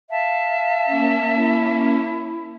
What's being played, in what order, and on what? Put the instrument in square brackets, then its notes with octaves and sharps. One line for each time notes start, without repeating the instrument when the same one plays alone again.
[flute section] E5 A5 [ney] F5
[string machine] A#3 C#4
[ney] E4